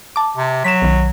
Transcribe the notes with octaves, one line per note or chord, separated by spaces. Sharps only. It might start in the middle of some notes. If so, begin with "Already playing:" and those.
A5 D6
C3
F#3 B6 E7
B1 D#3